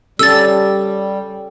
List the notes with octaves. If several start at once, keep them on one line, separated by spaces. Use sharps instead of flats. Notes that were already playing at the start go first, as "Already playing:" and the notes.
G3 C#4 G4 A4 E6 A6